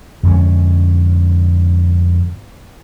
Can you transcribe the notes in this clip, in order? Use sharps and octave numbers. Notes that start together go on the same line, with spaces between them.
F2 G#2 D3 C#4